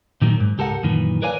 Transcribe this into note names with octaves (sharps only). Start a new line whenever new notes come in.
A#2 D#3 F#3 A#3
G#2
C#2 G4 A4 A#4 F#5
F#2 A#2 D#3 E3
A#4 B4 C#5 D5 F5 G#5